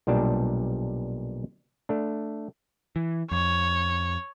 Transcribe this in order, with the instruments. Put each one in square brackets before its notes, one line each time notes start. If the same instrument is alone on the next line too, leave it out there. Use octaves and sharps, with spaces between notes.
[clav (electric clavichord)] B1 A#2 G3 D4 A5
A3 D4
[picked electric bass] E3
[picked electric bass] F2 [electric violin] C#5